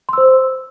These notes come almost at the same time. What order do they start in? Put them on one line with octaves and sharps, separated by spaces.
C6 E6 C5